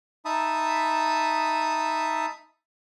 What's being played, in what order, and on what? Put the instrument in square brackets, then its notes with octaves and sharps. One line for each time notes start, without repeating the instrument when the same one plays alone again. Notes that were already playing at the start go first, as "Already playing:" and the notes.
[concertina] D#4 E5 A5 B5 D#6